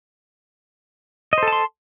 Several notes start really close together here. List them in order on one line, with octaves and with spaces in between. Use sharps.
D#5 C5 A4 A5 C6